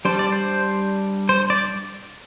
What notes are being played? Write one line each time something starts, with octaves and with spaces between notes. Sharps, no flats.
G3 D4 C5
D5
C5
C5
D5